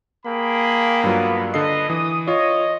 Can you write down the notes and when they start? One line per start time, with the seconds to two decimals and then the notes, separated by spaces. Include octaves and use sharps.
0.26 A#3 G#4 G5 B5
1.04 G2 F#3 B3 F4
1.54 D3 A4 B4 D#5 C7
1.90 E3 D#6
2.28 F4 C#5 D#5